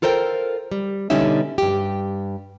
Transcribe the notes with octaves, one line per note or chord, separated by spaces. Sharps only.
F4 A4 A#4 C5 E5 G5
G3
B2 D3 G3 C#4 D#4 E5
G2 G4